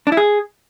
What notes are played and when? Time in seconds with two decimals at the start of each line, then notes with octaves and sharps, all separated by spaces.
0.07 D4
0.12 E4
0.17 G#4